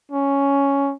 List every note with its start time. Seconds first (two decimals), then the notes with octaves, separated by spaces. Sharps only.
0.11 C#4